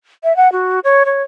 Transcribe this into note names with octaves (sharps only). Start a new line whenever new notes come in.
E5
F#5
F#4
C#5
C#5